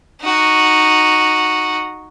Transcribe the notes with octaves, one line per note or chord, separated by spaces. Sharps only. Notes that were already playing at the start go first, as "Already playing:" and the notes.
D#4 F#4